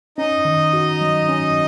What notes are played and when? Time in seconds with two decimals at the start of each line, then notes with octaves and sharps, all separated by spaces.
0.18 C#4 D#4 D#5
0.45 D#3
0.73 F#4
1.01 F#3
1.29 C#4